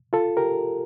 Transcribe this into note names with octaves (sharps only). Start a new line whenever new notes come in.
F4 A4
G4 A#4